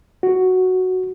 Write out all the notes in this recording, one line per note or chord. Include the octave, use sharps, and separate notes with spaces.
F#4